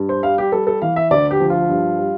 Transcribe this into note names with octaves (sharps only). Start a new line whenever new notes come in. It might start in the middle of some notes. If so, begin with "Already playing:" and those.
Already playing: G2
C5
G3 F5
G4
G3 A4
A4
E3 F5
E5
D2 D5
G4
F3
F4
G2
G3